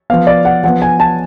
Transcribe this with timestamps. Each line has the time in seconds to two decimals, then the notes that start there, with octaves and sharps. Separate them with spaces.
0.10 F3 B3 F5
0.27 D5
0.45 F#5
0.63 F3 B3 F#5
0.82 G#5
1.00 A5